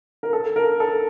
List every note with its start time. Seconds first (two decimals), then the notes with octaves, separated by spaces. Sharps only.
0.23 A#4
0.33 A4
0.56 A#4
0.80 A4